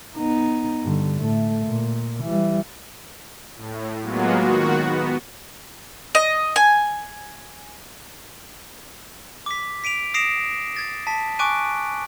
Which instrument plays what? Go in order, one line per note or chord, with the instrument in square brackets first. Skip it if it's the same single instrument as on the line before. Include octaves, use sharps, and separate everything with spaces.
[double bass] B3 D#4
G2 D3
A2 A3
A#2
E3 G3
[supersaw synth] A2
F#3 G#3 A#3 B3 F4 F#4
D#3 F#4
B3
[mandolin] D#5
G#5
[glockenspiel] D6 B6
B6 D7 D#7 F7
D#6 A#6 C7 D7 E7 F7
G#6 A6
A5 B6
G#5 C#6 D6 F#6 D7 D#7